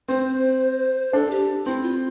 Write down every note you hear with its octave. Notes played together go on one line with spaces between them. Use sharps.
C4 C5
D4 A4
G4
C4 E4
F4